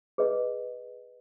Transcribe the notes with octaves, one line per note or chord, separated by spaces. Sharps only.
G#4 B4 D#5